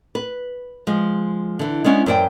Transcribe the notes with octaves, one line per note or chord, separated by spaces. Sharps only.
B4
F3 G#3
D3 E3
G#3 B3 C#4 D4 E4
F#2 E3 C5 D5 G5